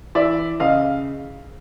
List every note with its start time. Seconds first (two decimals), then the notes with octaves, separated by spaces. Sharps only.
0.15 E3 D5 E5
0.60 C#3 D#5 F5